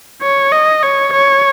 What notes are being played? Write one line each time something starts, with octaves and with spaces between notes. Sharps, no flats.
C#5
D#5
C#5
C#5